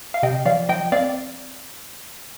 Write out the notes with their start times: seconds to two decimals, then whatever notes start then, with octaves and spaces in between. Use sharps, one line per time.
0.14 F5
0.23 C3 D#5 G5
0.46 F3 D5 F5
0.69 F3 D#5 G5
0.92 C4 D5 F5